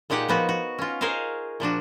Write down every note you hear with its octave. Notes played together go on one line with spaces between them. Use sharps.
A#2 G#3 D#4 G4 F#5
F3 B3 F#4
F#4
C#4 F4
G#4 A#4 C5 C#5 D#5 F5
A#2 F3 D4 F#4